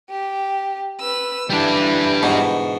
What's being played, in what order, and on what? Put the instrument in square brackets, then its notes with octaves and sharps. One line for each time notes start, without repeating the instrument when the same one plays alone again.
[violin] G4
B4 E6
[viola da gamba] D3 E3 [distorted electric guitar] G3 D4 [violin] E4
[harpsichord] G#2 B2